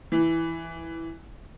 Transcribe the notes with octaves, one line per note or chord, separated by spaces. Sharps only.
E3